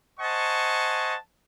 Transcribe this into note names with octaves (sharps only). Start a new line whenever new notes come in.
C5 D#5 F#5 G#5 A5 C#6